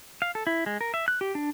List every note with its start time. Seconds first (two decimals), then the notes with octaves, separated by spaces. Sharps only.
0.22 F5
0.35 A4
0.47 E4
0.66 G#3
0.81 A#4
0.94 E5
1.08 F#6
1.21 G4
1.35 D4